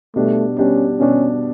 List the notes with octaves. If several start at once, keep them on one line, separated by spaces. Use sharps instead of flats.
B2 G3 A3 D4 G4
B2 G3 C#4 D4 G4
B2 G3 C#4 D4 G4